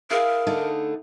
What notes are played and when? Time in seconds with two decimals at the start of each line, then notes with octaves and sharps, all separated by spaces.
0.11 E4 G#4 A#4 F5
0.47 D3 A3 D#4